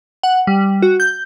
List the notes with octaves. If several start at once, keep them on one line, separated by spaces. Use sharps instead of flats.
F#5
G3
F#4
G6